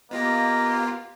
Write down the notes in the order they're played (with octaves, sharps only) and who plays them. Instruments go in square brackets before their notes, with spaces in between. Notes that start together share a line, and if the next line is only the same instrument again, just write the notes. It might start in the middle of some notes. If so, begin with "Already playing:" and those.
[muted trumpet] A#3 [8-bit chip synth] B3 F4 G4 [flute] D#5